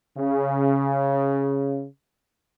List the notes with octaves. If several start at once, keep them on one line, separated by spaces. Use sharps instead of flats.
C#3